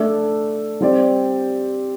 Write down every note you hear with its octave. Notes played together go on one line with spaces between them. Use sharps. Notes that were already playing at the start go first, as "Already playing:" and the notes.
Already playing: A3 D4 A4
G3 C4 G4 D5